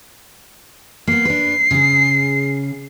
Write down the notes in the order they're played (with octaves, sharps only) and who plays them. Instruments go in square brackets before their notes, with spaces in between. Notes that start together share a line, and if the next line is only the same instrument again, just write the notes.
[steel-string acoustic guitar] A#3 B3 [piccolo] C7
[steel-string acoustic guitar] D4 B4
C#3 G#4